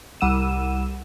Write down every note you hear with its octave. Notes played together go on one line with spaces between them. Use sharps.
C2 G3 F#5 E6 D#7 E7